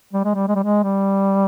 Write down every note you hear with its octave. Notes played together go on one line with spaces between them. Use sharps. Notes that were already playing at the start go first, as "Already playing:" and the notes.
G3
G#3
G3
G#3
G3
G#3
G3